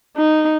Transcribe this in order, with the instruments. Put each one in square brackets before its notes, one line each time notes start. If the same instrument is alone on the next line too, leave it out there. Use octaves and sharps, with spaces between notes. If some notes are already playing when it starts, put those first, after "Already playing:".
[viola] D#4